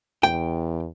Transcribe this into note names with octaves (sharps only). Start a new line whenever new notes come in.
E2 G5